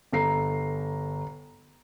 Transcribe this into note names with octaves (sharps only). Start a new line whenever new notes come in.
G1 A4 A#5 C7